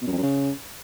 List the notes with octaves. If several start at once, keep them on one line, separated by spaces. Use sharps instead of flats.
B2
F#2
F2
F#2
C#3